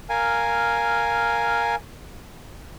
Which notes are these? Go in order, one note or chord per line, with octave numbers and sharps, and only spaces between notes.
A#4 F5 G#5